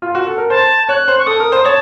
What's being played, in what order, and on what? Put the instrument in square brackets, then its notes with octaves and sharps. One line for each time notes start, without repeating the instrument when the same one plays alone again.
[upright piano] F4
F#4
A4
A#4
[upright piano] C5 [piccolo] A5
[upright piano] C#5 [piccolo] F#6
[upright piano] C5
[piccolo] C#6
[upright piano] A4 [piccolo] D#6
[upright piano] A#4
C5
[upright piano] C#5 [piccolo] A5